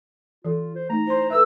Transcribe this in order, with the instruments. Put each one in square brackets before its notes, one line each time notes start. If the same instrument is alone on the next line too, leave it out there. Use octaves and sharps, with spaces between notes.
[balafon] E3 A4 [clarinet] F4
[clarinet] C5
[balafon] A3 D#4 [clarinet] A#5
[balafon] E4 C6 [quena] C5
[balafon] A4 B4 E5 [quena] E6